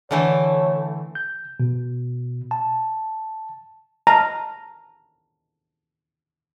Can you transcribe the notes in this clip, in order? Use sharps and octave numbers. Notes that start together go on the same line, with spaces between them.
D3 E3 A3 C#5
G6
B2
A5
A5 A#5 F6